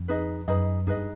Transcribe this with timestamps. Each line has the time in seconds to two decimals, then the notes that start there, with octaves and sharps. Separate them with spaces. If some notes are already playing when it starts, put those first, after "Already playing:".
Already playing: F2
0.08 D#4 G#4 B4 D#5
0.48 F#2 D#4 G#4 B4 D#5
0.87 G2 D#4 G#4 B4 D#5